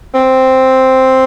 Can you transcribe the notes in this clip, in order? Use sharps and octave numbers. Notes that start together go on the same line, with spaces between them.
C4